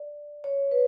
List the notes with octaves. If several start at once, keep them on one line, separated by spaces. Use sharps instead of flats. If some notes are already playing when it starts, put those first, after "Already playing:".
Already playing: D5
C#5
B4